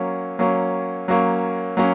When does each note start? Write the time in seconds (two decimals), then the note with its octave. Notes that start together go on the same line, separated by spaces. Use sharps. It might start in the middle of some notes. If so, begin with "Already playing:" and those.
Already playing: F#3 A#3 C#4
0.39 F#3 A#3 C#4
1.08 F#3 A#3 C#4
1.77 F#3 A#3 C#4